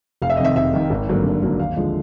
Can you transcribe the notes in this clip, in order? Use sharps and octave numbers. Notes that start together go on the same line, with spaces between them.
F1 F5
E5
D#5
F2 C3 D#3 E5
F1 E5
F2 C3 D#3
G#1
G2 D3 F#3 A#3
G#1
G2 D3 F#3 A#3
D#2 F5
D3 F3 G#3